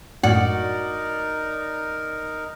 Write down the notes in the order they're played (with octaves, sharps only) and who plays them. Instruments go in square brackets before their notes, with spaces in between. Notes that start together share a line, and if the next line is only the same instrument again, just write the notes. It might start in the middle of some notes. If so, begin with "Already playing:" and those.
[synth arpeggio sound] F#2 A2 [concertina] D#4 A#4 [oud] F#4 [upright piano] D5